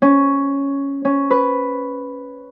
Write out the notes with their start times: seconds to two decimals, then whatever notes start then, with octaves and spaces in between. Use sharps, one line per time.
0.02 C#4
1.05 C#4
1.31 B4